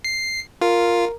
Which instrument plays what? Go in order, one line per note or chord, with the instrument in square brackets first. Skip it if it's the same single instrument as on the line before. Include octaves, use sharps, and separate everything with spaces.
[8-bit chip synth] C7
[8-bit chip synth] F4 [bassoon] A#4